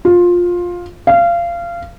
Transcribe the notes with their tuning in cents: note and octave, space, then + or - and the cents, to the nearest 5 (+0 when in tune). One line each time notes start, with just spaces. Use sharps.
F4 +15
F5 -25